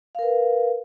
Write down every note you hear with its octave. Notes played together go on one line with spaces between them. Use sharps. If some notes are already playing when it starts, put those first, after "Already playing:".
A#4 B4 F5